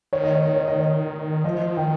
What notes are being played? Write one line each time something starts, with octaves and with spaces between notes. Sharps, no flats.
D#3 C#5
D#5
C#5
D#5
C#5
D#5
C#5
F3 D#5
D#3 G5